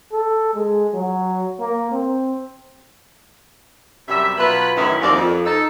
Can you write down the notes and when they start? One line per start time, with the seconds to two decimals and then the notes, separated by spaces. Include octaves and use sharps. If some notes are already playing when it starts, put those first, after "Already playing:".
0.12 A4
0.54 G#3
0.94 F#3
1.60 A#3
1.92 C4
4.08 F#2 C3 G3 E5
4.38 B2 F#3 F4 B4
4.75 F#2 A2 D#3 E3 C#4 E4
5.01 D#2 F3 C4 F#4 A#4 D5
5.14 F2
5.45 D#4 A4